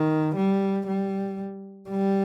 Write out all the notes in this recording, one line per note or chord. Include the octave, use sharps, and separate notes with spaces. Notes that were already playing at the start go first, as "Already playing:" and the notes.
Already playing: D#3
G3
G3
G3